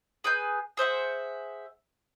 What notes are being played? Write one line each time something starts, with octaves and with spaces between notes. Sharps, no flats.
G#4 B4 G#5 G6
G#4 C5 E5 F#5